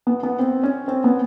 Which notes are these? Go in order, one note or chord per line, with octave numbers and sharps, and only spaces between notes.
B3
B3
C4
C#4
C4
B3